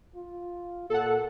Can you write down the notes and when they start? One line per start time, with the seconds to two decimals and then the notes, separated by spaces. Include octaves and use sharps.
0.16 F4
0.90 A#2 A4 F#5